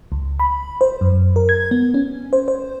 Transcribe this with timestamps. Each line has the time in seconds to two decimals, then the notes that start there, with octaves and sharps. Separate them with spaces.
0.12 C#2
0.40 B5
0.81 C5
1.01 F#2
1.36 A#4
1.49 G#6
1.71 B3
1.94 C#4
2.33 C5
2.48 C5